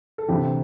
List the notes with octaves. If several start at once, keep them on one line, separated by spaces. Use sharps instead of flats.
A4
D2 C3 E3 G4